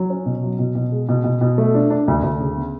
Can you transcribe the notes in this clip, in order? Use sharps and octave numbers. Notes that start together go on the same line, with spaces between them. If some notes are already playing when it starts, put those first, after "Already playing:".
Already playing: F#3
C#4
B2
F#3
B2
B2
G#3
B2
B2
B2
A3
D4
D4
D2
D2
C#3
B3